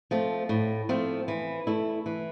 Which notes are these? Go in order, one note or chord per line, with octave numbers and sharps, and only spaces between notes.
F3 A3 C4
A2
F3 A3 C4
E3
A3 E4
E3